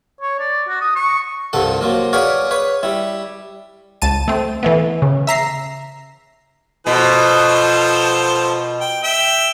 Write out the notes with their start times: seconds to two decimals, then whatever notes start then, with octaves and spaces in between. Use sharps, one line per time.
0.21 C#5
0.39 D5
0.68 F#4
0.81 D#6
0.96 C#6
1.53 C2 G2 F3 A4 F#5
1.81 F3 F#3 A#3
2.13 G#4 B4 C#5 D5 F5 F#5
2.51 B4 C#5
2.83 G3 E4
4.02 C#2 A5 D#7
4.28 A3 C4
4.63 E3 A3 B3
5.02 C#3
5.27 E5 A#5 C7
6.87 B2 F3 A4 C5
8.81 G5
9.04 E5 G5